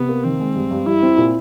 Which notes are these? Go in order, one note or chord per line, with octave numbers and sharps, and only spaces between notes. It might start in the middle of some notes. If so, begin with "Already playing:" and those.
Already playing: C3 B3
A#3
D#3 C4
G#3
G2
G2
G3 E4
C4
A#2